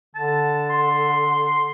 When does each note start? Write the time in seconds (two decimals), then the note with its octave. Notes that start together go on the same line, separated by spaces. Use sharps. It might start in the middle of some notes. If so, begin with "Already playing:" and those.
0.15 D3 A5
0.70 C6